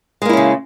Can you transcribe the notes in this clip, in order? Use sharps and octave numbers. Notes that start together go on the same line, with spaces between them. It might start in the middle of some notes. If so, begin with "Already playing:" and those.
C#3 G#3 A#3 C#4 E4